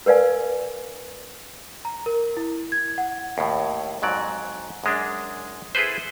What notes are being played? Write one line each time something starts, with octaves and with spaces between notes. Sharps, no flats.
A#4 B4 D5 F5 G#5
A#5
A#4
E4
G#6
F#5
D#2 A2
F2 G#2 F#3 D5
F#2 G#3 D4
E4 G#4 A4 B4 C5